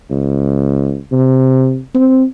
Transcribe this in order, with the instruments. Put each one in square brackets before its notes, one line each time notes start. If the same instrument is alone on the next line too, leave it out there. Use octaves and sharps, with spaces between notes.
[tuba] C#2
C3
C4